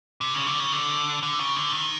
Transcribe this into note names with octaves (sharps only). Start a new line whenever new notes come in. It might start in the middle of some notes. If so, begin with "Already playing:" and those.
C3
C#3
D3
C#3
D3
D3
C#3
D3
D#3